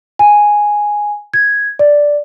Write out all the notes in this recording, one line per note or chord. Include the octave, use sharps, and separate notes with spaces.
G#5
G#6
D5